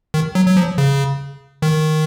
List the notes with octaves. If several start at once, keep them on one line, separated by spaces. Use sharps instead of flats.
D#3
F#3
F#3
F3
C#3
D#3